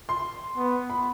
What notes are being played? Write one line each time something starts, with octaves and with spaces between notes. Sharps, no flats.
C6
B3
B5